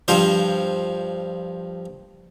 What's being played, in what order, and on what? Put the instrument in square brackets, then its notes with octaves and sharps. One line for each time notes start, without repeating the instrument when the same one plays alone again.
[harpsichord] G2 F3 C5